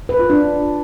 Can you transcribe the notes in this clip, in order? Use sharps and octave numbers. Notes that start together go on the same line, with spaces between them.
B4
F4
D4